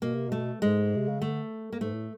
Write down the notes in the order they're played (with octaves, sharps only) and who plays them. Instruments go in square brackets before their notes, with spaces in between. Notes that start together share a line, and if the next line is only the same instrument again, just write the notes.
[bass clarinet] B2 [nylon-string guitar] A#3
[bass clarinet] C3
[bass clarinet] B2 [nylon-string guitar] A3
[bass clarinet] G#2 [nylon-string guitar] G#3
[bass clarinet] C3
C#3
[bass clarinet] D3 [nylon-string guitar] A3
[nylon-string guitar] A#3
[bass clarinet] G#2 [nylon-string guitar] A3
[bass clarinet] A2